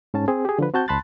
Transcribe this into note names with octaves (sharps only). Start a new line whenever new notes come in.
G#2 C#4 A5
C4 G#4
G4 G#4
D3 F3 B4
C4 F#4 A5 G6
C#2 A5 B5 C6 F#6 A6